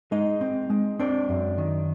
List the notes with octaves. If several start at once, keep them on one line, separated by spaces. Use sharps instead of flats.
G#3 D#4 D#5
C4
G#3
C4 D4 D5
F#2
D#3